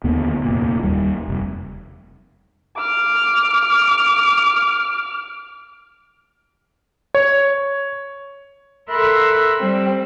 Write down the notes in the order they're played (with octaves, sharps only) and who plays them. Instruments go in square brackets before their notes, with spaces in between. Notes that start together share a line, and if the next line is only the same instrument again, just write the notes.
[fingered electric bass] D#2 D3 B3
F1 A#2
D#2 G3
F1
[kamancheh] D6 F6
[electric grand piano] C#5
[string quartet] A4 A#4 E5 B5 C6 F#6
G3 C4